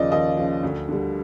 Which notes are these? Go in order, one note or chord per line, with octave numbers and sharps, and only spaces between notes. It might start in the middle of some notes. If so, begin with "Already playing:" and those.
Already playing: D#2 C#3 F3 D5 D#5
D#2 D#5
C#3 F3
D2
D3 G3